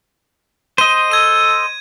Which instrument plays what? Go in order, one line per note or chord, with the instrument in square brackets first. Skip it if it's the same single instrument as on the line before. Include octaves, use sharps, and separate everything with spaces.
[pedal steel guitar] C5 D#5 [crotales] D#7
[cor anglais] A4 [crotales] G#6 D#7